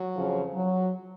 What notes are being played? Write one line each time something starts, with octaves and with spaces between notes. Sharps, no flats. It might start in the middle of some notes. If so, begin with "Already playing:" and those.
Already playing: F#3
F2 C#3 F3
F#3